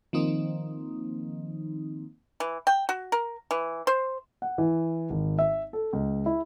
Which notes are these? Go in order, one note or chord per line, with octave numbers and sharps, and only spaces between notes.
D#3 F3 A#3 C4 D#4
E3
G5
F#4
A#4
E3
C5
F#5
E3
G#1
E5
A4
C#2
E4